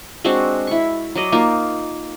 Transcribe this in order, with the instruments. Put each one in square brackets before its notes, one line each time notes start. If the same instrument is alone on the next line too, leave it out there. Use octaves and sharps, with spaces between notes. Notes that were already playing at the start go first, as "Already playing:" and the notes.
[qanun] G#3 C4 D4 F#4
E4 C#6
F#3 D5 D#5
A#3 D#4 F4 A#4